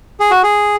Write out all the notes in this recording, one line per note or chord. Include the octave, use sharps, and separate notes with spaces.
G#4
F#4
G#4